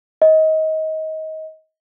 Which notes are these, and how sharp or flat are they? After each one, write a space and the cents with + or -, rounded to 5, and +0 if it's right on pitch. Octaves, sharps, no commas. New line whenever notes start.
D#5 +25